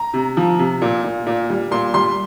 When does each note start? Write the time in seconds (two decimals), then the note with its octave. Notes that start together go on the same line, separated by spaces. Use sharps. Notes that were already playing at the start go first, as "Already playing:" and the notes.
Already playing: A#5
0.14 C3
0.37 F3
0.59 C3
0.82 A#2
1.04 A#2
1.26 A#2
1.50 G3
1.71 A#2 C6
1.94 G3 C6